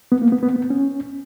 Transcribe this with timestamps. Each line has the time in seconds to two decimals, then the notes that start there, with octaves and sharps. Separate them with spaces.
0.12 B3
0.22 A#3
0.32 B3
0.43 B3
0.56 B3
0.70 C#4